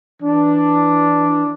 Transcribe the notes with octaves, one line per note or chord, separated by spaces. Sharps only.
E3 D4